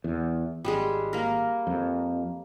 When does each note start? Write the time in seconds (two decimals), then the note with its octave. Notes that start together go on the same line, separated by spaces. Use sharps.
0.04 E2
0.65 G#1 G3 G#3 G#4
1.13 A#3 A#4
1.67 F2